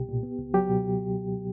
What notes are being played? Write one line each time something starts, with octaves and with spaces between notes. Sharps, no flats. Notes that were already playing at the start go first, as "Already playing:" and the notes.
Already playing: C2 B2 G4
A#2
B3
C#2
F#3 G4
B2